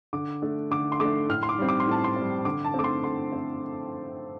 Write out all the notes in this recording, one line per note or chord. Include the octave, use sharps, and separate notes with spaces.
D3 D6
A3 D4
D3 D6
C6
A3 D4 D6
A2 F6
C6
D6
G3 C4
D6
C6
A2 A5
C6
G3 C4
D3 D6
A5
A3 C4 D6
C6
D3 C6
C4